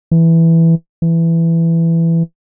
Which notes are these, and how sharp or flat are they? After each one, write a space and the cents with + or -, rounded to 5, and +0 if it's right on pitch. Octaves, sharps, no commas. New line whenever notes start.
E3 +0
E3 +10